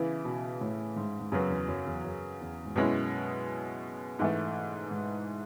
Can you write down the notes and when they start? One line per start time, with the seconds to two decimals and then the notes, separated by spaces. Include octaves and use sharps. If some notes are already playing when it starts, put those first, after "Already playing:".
Already playing: C#3 E3 B3 E4
0.25 B2
0.61 A2
0.96 G#2
1.20 G#2
1.32 F#2 C#3 F#3 B3 F#4
1.50 E2
1.68 F#2
1.86 E2
2.04 F#2
2.40 E2
2.65 G#2
2.75 F#2 B2 G#3 C#4 E4
4.19 G#2 E3 A3
4.91 G#2